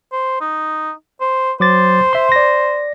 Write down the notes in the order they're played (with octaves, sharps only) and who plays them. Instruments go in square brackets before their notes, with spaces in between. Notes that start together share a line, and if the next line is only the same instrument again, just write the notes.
[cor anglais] C5
D#4
C5
[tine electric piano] F#3 D6 A6 [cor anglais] C5
[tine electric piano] E5 C6
D5 A#6